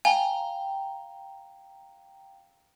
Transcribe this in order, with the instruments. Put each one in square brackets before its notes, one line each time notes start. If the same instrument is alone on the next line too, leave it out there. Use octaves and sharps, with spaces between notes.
[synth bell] F5 G5 A#5 [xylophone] G#5